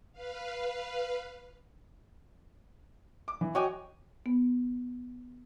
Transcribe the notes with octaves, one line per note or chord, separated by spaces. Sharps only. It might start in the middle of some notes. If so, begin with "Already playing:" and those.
B4 F5
D6
E3
F#4 C#5 D#5 G5 G#5 D6
B3